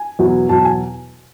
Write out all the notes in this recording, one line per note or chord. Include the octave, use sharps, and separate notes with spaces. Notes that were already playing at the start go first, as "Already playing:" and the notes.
Already playing: G#5
E2 B2 F#3
E2 B2 F#3 A5
G#5